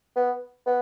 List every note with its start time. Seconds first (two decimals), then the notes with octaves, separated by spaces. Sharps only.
0.16 B3
0.66 B3